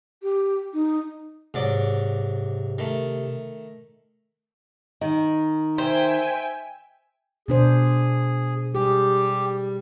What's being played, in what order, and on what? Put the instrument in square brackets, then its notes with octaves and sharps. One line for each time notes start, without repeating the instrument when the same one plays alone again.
[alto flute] G4
D#4
[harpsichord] G#2 F#3 D5 [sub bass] C3
[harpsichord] D#3 A3
[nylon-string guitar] D#3 [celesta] D#5
[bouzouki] C5 [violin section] E5 G5 G#5
[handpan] B2 D4 C5 [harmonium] G#4
[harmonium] G3 [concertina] G4 [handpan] G#4